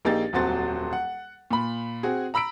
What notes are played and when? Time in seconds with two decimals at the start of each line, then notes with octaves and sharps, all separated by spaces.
0.05 A#1 A#3 D#4 G4 G#4 A6
0.33 D#1 F2 F#3 F#4 C5 A6
0.93 F#5
1.51 A#2 B5
2.03 C4 F#4 G#4
2.34 A#5 B5 E6 B6 D7